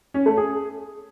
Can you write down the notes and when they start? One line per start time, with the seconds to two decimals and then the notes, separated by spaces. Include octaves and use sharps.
0.14 C#4
0.26 A3
0.37 G#4